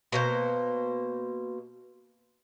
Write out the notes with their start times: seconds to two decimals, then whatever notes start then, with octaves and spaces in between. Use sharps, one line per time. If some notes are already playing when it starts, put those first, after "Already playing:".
0.12 B2 A#3 C5